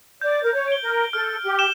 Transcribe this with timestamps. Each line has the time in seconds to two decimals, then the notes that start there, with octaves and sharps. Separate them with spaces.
0.21 D5 G6
0.43 A#4
0.53 C#5
0.68 D7 G7
0.83 A#4
1.13 A4 F6
1.44 G4
1.59 E7 G7